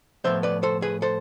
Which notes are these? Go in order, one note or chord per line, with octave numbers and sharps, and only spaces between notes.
A2 F3 B3 C5 E5
B4 D5
A4 C5
G#4 B4
A4 C5